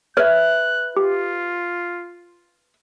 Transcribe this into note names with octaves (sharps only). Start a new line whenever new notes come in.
B4 C#5 E5 F6 F#6 G#6
F4 G4